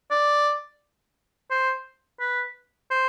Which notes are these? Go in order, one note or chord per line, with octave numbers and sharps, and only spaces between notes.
D5
C5
B4
C5